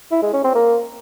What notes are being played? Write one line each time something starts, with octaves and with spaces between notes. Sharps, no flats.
E4
G#3
C#4
C4
A#3